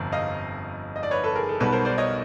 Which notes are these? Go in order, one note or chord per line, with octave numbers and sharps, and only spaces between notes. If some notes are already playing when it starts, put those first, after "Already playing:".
Already playing: G1 F2 C3
D#5 F5
D#5
D5
B4 C#5
A4 B4
G#4 A#4
A4
B1 B2 G3 A4 B4
A#4 C5
C5 D5
C#5 D#5